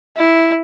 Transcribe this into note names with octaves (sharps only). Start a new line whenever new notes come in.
E4